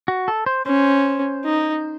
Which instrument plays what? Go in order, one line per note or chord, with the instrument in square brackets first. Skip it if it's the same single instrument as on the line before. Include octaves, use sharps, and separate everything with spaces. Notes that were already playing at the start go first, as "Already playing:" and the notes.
[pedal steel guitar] F#4
A4
C5
[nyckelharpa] C#4 [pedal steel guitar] C5
[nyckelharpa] D#4